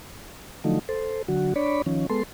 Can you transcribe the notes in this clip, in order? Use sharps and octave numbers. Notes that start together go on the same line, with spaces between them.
D3 F3 F#3 A3 D#4
A4 C5
D3 F#3 F#4
D4 C#5 D5 B5
D#3 F3 C#4
G#3 B3 A4 C6